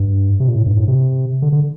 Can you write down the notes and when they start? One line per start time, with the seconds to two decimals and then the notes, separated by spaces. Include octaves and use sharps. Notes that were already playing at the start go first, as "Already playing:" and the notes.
Already playing: G2
0.40 C3
0.48 A#2
0.55 A2
0.66 G2
0.77 A2
0.88 C3
1.42 D3
1.52 D3